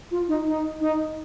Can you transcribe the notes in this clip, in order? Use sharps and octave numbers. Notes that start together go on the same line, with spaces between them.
F4
D#4
D#4
D#4